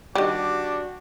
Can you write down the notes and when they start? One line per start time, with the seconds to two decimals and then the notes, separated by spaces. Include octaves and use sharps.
0.15 D#3 G3 D4 F#4 G4